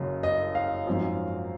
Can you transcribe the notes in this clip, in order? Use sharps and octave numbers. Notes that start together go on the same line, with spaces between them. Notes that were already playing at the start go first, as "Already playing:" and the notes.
Already playing: F#1 F#2 C#3
D#5
F5
G#1 F#2 F3